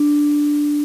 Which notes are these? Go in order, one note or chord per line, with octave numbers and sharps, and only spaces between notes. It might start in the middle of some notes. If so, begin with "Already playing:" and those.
Already playing: D4